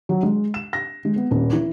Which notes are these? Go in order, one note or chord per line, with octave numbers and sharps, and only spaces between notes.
F#3
G#3
E7
A#6
G#3
B3
D#1
E3